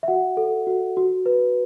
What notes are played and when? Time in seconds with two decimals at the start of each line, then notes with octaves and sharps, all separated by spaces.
0.03 E5
0.08 F#4 F#5
0.37 A4
0.67 F#4
0.97 F#4
1.26 B4